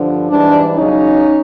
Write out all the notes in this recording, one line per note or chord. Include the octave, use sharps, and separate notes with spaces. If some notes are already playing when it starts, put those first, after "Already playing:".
Already playing: G2 D3 F3
G#2 E3 G3 D4
E2 C#3 F#3 C#4 D#4